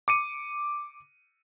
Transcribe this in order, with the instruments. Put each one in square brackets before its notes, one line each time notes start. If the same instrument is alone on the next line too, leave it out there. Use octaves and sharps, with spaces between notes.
[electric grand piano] D6 C#7 D#7